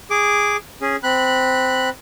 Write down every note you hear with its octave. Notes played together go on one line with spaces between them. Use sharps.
G#4 D6
C#4 G#4
C4 B5 F#6